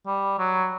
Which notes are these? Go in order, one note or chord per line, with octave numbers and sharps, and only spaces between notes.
G3
F#3